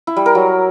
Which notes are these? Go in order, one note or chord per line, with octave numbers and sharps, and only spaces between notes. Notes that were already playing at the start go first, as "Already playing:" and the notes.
E4
G3
A#4
F#3